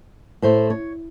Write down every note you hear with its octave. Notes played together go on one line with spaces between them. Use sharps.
A2 A3 C5
C#5